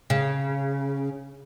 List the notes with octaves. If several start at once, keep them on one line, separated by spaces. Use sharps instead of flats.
C#3